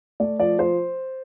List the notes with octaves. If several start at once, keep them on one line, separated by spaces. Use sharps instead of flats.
A3 D5
F3 D5
F3 C5